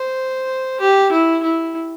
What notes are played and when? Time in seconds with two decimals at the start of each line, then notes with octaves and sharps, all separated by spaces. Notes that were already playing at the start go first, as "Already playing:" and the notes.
Already playing: C5
0.80 G4
1.12 E4
1.43 E4